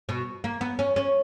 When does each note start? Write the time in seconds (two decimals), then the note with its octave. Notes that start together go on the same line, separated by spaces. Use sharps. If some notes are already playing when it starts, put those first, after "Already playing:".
0.09 B2
0.44 A#3
0.61 B3
0.79 C#4
0.96 C#4